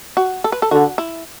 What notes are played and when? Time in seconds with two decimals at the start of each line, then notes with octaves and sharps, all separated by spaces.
0.17 F#4
0.44 A4
0.52 B4
0.62 A4
0.71 D3 F#4
0.98 E4